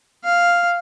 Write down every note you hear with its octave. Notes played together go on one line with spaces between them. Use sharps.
F5